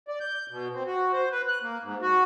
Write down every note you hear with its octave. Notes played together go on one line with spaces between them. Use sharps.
D5
G6
B2
C4
F#4
C5
B4
F#6
A#3
G#2
F#4